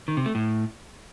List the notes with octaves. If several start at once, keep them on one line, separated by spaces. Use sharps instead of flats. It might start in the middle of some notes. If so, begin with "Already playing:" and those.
D#3
C3
A3
A2